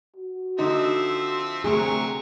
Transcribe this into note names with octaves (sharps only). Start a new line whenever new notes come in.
F#4
D3 F3 C4 D#4 E5
D2 C3 F#3 G#4 A#4 C#6